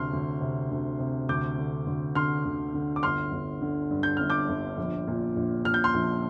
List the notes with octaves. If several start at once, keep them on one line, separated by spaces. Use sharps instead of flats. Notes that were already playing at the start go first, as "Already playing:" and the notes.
Already playing: D2 C3 C6 F6
D2
C3
D2
C3
D2 D6 G6
D3
D2
D3 C6 F6
D2
D3
D6
G1 C6 F6
G1
D3
G2
G6
G1 F6
D6 G6
G1
A#1
A#2
A#1
A#2 F6
G6
C6 F6
A#1